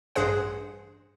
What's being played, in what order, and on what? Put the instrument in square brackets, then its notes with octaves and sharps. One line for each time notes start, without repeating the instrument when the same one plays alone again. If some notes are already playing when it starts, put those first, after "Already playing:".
[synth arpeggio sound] A1 G2 G#4 C5 F#5